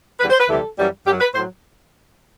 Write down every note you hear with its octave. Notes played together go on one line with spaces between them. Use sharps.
E2 D3 G3 B4
C5
B4
D2 C3 E3 G3 A4
F#2 E3 G3
F#2 F#3 G4
B4
A2 F#3 C5